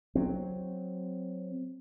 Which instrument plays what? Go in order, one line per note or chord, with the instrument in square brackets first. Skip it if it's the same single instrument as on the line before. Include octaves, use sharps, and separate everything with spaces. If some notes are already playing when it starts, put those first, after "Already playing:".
[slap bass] F#3 C4